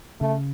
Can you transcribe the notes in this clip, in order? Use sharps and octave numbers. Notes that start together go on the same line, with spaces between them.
C#3 A3